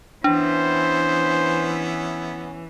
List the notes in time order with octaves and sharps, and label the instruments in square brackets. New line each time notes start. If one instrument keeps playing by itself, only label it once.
[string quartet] E3 [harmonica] B3 C#4 E4 [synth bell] D4 [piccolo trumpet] C5